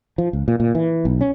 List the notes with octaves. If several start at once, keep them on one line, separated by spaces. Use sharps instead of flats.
F3
C#2
A#2
A#2
E3
B1
C#4